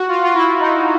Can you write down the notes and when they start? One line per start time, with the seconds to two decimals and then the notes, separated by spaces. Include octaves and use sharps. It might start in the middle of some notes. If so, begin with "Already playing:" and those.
Already playing: F#4
0.08 F4
0.24 F4
0.35 E4
0.60 D#4